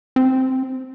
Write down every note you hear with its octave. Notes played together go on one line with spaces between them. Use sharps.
C4